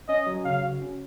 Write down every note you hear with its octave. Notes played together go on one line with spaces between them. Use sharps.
C#4 D#5
F#3
C#3 F5
F#4
C#4